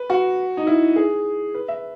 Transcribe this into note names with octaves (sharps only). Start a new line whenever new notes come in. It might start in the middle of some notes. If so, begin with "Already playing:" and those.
Already playing: B4
F#4
D#4
E4
G#4
B4
E5